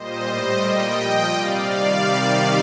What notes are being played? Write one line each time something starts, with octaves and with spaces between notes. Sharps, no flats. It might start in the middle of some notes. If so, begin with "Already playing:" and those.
Already playing: A#2 G3 C5 D#5
A2 G3 C5 D#5
A#2 G3 D#5 G5
A#2 F3
C3 G3 D5 F5
C3 D#3 G3